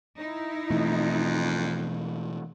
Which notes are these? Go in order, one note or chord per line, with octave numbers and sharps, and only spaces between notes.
D#4 E4
F2 B2 E3 A3